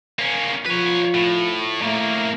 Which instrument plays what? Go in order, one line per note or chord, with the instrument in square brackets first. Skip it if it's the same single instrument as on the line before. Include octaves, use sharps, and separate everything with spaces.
[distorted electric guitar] A#3 C#4
[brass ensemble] F3 F4 [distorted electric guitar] B4 C#5
[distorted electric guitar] A2
[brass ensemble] A2 E5 A#5 [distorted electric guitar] A3 A#3